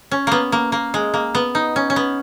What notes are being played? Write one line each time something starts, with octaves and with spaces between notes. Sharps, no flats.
C#4
A#3 B3
A#3
A#3
G#3
A#3
B3
D#4
C#4
C#4
B3